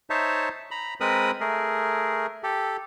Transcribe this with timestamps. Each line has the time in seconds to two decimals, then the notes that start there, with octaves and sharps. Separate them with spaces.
0.10 D#4 C5 C#5 E5 A5
0.71 A#5 B5
1.01 G#3 C4 A#4 B4 B5 D#6
1.41 A3 G#4 A#4
2.43 G4 A4